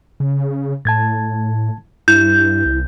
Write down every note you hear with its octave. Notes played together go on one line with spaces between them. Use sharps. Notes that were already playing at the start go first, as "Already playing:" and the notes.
C#3
A2 A5 G#6 A6
G2 E4 G6
C2